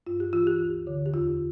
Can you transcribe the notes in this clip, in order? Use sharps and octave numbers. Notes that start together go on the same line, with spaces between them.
G2 F4
G4
E3 F4
G4
D2
D3
G4
E2 F4